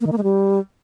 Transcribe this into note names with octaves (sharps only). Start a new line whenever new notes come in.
A#3
D#3
A#3
G#3
G3